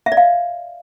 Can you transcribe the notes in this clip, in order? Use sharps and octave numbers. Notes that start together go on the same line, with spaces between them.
E5
D5
F5